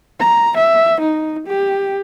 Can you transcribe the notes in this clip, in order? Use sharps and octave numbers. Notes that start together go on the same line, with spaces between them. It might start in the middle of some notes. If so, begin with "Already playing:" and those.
A#5
E5
D#4
G4